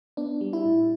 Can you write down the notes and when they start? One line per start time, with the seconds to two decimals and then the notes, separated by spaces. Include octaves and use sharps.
0.17 B3 D4
0.41 G3
0.53 E4
0.65 A2